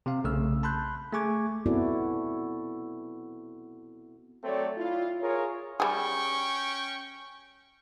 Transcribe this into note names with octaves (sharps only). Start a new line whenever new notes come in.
C3 C4 F5
B1 C#3 A3 E6 F6
A5 B5 C6 F#6 G6
A3 G#4 G#5 C#6 D6 G#6
B3 C4 E4 F#4 A4 D5
F#3 A3 C4 A4 C#5 D5
E4 F4
F4 G#4 A#4 C#5
G3 C#4 G#4 G5 C#6